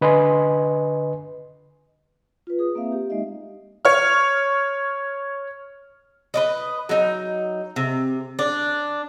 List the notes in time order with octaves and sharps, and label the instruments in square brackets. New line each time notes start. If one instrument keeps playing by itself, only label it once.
[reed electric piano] D3 B4 D#5 G#5 C6
[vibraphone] F4 B4
G#4 D#6
A#3 C4 E5 F5
G4
G#3 A#3 D#4 D#5 E5
[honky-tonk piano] C#5 F6
[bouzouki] B4 D5 D#5
F#3 D#4
C3
D4